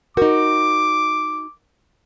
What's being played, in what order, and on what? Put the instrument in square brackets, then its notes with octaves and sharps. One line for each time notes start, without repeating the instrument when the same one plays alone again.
[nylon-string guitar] D#4 F#4 [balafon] A#4 [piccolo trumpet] D6